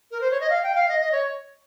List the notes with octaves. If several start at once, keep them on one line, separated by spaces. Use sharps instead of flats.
A#4
C5
C#5
D#5
F5
G5
F5
D#5
D#5
C#5